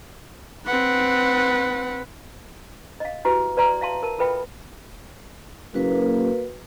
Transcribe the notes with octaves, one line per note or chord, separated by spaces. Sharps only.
C4 B4 F#5
D#5 F5
E4 F#4 G4 B4
B4 D5 E5 A#5 C6
E5 F5 A5 C6
A#4 A5
F4 A4 B4 E5 G5 B5
F#1 A#3 F#4 B4